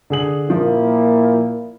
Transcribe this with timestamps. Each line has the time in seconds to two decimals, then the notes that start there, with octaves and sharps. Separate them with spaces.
0.10 D3 G#4 F#7
0.50 A#2 F3 A#3 E4